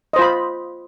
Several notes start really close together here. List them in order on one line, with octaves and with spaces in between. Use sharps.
D#5 C5 F4 B5